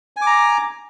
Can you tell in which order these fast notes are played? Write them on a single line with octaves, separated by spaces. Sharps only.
G#5 D6 A#5